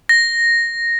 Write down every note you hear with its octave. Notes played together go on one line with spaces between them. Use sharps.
A#6